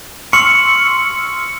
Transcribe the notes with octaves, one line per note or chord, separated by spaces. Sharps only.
C6 C#6 E6 F6 C#7 F#7